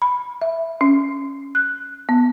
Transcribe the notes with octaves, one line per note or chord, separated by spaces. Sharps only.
B5
E5
C#4
F#6
B3